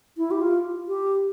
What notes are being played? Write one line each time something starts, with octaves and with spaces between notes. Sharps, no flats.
E4
G4
F4
G4